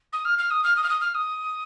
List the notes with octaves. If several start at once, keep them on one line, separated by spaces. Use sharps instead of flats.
D#6
F6
F6
D#6
F6
D#6
F6
D#6
F6
D#6